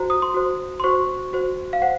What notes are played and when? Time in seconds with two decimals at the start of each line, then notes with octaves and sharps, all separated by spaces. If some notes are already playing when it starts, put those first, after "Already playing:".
Already playing: F#4 C5 A#5
0.10 D#6
0.22 C6
0.34 F#4 C5
0.80 C6
0.84 F#4 C5 C#6
1.33 F#4 C5
1.73 F5
1.82 C5 F#5